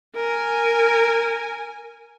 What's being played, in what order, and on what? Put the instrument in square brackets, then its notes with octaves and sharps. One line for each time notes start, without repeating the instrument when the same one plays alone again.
[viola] A#4 G#5